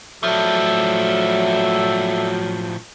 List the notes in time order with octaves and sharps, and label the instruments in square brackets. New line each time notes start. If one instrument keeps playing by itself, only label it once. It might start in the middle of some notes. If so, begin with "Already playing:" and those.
[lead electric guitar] A2 F3 [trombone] F#3 [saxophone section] A4 D5 E5